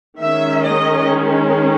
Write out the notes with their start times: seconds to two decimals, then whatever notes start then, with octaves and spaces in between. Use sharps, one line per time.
0.19 D#3 G#3 C#4 E5
0.64 D#5